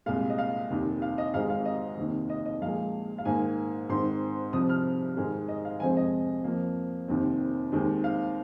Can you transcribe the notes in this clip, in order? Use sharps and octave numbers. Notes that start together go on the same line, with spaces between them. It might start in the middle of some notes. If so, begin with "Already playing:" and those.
C2 A#2 G#3 F5
D#5
F5
F1 D#2 D#3
F5
D#5
G#1 G#2 G#3 F5
F5
D#5
F1 D#2 D#3 A#3
D#5
D#5
A#1 A#2 G#3 F5
F5
G#2 D#3 A#3 G#5
G#2 D#3 C4 C6
C2 C3 F3 D#6
F6
G#2 D#3 G#3
D#5
F5
F1 F2 F3 G#3 C4 G#5
D#5
F2 F3 A#3
F1 D#2 D#3 C4
D#2 D#3 G#3 C4
F5